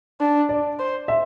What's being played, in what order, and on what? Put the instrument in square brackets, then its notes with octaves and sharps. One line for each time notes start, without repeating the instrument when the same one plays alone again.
[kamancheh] D4
[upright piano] D5
[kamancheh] C5
[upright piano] E5